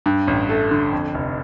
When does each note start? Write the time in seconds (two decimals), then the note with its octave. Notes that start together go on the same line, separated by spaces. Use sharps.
0.06 G2
0.27 A1
0.49 A3
0.71 D3
0.92 F2
1.14 F1